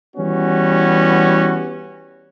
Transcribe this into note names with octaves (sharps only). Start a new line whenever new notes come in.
E3 G3 B3 C#4 F#4